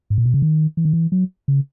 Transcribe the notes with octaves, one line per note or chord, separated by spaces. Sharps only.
G#2
A#2
B2
C#3
D#3
E3
D#3
E3
F#3
C#3